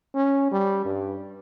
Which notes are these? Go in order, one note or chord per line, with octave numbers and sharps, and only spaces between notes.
C#4
G3
G2